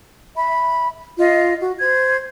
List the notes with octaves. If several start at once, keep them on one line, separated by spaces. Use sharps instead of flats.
E5 B5
F4 D#5
F#4
C5 G#6